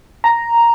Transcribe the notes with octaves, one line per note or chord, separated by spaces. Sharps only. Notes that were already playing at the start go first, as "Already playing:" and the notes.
A#5